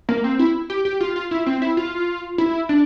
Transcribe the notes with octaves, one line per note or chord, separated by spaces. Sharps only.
A#3
C4
E4
G4
G4
F4
F4
E4
C4
E4
F4
E4
D4